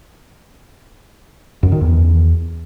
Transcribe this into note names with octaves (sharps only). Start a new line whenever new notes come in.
F#2
D#3
E2